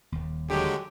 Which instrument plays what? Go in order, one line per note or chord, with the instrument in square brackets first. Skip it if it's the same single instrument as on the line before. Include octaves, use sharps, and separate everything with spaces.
[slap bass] D#1 D#2
[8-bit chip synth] D3 F#3 G#3 [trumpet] G4